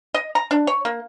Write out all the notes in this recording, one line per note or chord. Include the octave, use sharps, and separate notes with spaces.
D#5
A#5
D4
C#5
A#3